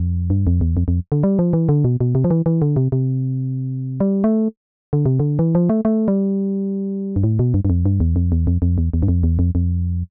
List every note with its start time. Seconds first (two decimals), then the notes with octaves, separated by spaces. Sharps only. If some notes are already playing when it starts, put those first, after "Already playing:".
Already playing: F2
0.30 G2
0.47 F2
0.61 E2
0.77 F2
0.88 F2
1.12 D3
1.23 G3
1.39 F3
1.53 E3
1.69 D3
1.84 B2
2.01 B2
2.15 C3
2.24 F3
2.31 E3
2.46 E3
2.62 D3
2.76 C3
2.92 C3
4.00 G3
4.24 A3
4.93 D3
5.06 C3
5.20 D3
5.39 E3
5.55 F3
5.69 A3
5.85 A3
6.08 G3
7.16 G2
7.23 A2
7.39 B2
7.54 G2
7.65 G2
7.70 F2
7.86 G2
8.00 E2
8.16 F2
8.32 E2
8.47 F2
8.62 F2
8.78 E2
8.94 E2
9.03 G2
9.08 F2
9.23 E2
9.39 F2
9.55 F2